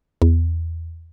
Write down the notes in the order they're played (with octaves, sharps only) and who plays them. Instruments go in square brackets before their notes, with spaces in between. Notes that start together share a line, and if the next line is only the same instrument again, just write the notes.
[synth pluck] E2